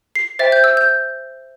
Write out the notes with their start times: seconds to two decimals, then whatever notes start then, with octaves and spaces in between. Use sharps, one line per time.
0.15 C7
0.39 C5 E5 G5 A6
0.52 G6
0.64 E6
0.77 G6